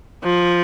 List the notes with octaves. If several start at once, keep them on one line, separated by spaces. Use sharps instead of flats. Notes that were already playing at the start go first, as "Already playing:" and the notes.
F3